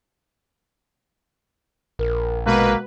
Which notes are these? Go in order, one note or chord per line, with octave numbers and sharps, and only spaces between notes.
A#1 A#4
B2 G#3 A#3 B4